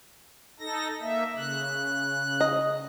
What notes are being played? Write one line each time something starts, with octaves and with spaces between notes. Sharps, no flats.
D#4 A4 A#6
A#3 E5
C#3 F#6
D#5